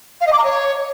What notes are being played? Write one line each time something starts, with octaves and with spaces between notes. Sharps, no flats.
F5
D#5
D6
A#5
C#5